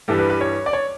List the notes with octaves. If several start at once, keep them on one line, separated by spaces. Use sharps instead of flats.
G2 E3 G3 A4
B4
B4
C#5
D5
C#5